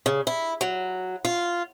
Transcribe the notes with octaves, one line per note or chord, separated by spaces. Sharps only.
C#3
E4
F#3
F4